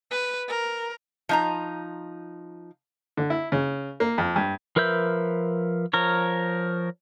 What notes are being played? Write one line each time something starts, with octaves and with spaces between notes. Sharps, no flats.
B4
A#4
F3 D#4 A#5
D3
E4
C#3
A#3
F2
G2
F3 A#4 B4 E5 G6
F3 A#4 C#5